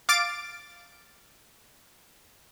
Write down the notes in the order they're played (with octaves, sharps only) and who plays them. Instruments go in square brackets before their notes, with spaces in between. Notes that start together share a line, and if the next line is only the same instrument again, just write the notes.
[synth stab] F5 D6 A6 D7